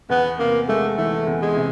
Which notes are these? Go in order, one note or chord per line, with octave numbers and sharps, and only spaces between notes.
E2 B3
C3 A#3
G#3 A3
E3 A3
E2
G#3
C3